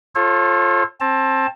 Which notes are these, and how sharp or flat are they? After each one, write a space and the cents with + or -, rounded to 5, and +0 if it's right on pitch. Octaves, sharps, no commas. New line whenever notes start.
F4 +0 A4 +0 C#5 -40
C4 +25 A5 +0